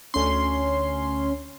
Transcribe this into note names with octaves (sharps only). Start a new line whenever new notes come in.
D2 C#4 C6